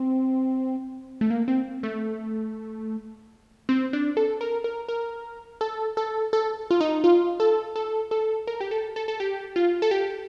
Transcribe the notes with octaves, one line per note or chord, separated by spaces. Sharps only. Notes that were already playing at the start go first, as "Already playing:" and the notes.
Already playing: C4
A3
A#3
C4
A3
C4
D4
A4
A#4
A#4
A#4
A4
A4
A4
F4
D#4
F4
A4
A4
A4
A#4
G4
A4
A4
A4
G4
F4
A4
G4